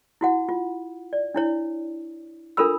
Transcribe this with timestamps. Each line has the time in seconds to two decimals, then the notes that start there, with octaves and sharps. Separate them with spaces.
0.21 E4 F#4 F#5
0.49 F4
1.13 D5
1.34 D4 E4 C#5
2.57 D4 F4 A4 A#4 B5 E6